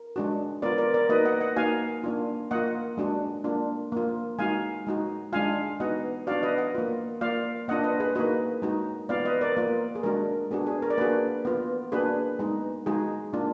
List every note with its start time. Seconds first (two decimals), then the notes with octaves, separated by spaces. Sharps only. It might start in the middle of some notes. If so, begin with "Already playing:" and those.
Already playing: A#4
0.16 G#3 D4 F#4
0.62 B3 F4 A#4 D5
0.78 A#4 D5
0.94 A#4 D5
1.09 A#3 D#4 F#4 B4 D#5
1.25 D#5 F#5
1.40 D#5 F#5
1.56 A#3 D#4 F#4 F5 G#5
2.04 A#3 D4 F4
2.51 A#3 F4 D#5 F#5
2.97 G#3 D4 F#4
3.44 A#3 D4 F4
3.92 A#3 F4
4.39 G#3 D#4 F#4 F5 G#5
4.87 G#3 D#4 F#4
5.33 G#3 D4 F4 F5 G#5
5.80 B3 D#4 F#4 D#5 F#5
6.27 B3 D4 F#4 D5 F5
6.43 B4 D#5
6.58 D#5 F#5
6.75 A#3 F4
7.21 A#3 F4 D5 F5
7.68 A#3 D4 F4 D#5 F#5
7.84 B4 D#5
8.00 G#4 B4
8.15 A#3 D#4 F#4 B4 D#5
8.62 G#3 D#4 F#4
9.09 B3 F4 D5 F5
9.25 B4 D#5
9.41 A#4 D5
9.57 A#3 F4
9.95 G#4
10.03 G#3 D4 F#4 A#4
10.51 B3 D4 F#4 G#4
10.67 G#4
10.82 A#4
10.90 D5
10.97 A#3 D4 F#4 G#4 B4
11.45 B3 F4
11.92 A#3 D4 F#4 G#4 B4
12.39 G#3 B3 D#4
12.86 G#3 D#4 F#4 G#4
13.33 A#3 D4 F4